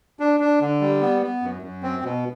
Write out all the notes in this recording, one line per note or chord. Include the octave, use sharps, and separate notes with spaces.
D4
D4
D3
G3
B3
B3
F#2
F#2
C4
B2